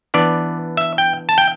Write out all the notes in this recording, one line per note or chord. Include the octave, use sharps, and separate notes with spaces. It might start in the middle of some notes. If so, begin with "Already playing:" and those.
E3 B3 D4 D5
E5
G5
A5
G5